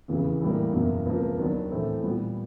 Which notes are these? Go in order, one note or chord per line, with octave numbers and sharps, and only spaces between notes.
F1 E2 C#3 E3
A2 E3 G3 A#3
F#1 E2 B2 F#3 A#3
C#2 C3 F3 A#3
D#2 D#3 F#3 B3 D4
A2 E3 A3 C4
A#2 G3 B3